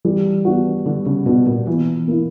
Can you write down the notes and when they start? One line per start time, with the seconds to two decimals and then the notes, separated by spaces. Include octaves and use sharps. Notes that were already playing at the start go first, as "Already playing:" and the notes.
0.05 E3 G3
0.45 B3 D4 F#4
0.86 D3 G3
1.07 C#3
1.26 B2 B3 D4 F#4
1.47 A#2
1.67 B2 E3
2.08 A#3 E4